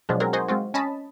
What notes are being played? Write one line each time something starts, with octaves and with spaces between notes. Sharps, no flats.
B2 F3 F#3 G#3 D4
F#3 C4 G#4 A#4
D#4 F#4 C5 D#5 G#5
G#3 C4 F4 F#4
C#4 D#5 A5 B5